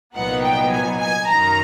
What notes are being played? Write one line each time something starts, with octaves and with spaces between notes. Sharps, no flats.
C2 A#2 F#3 B3 D#4 F#5
G5
G#5
G#5
F#2 D#3 F#3 A#5